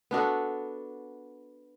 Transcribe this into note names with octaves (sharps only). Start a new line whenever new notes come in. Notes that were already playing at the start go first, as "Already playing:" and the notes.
B3 D4 F#4 A4